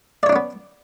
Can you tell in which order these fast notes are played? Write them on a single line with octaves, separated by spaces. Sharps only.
D5 C#5 D4 C#4 B3